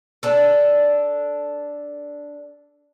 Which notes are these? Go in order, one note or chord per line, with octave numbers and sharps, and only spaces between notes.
D4 A4